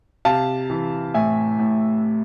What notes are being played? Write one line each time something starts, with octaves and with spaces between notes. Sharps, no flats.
C3 F5 A5
E3
A2 E5 G#5
A2